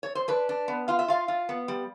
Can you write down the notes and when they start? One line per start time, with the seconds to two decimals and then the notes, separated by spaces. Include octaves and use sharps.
0.03 C#5
0.15 C5
0.28 D4 B4
0.49 D4
0.68 B3
0.88 F4 F5
0.99 E5
1.08 F4 F5
1.28 F4
1.49 B3
1.68 G3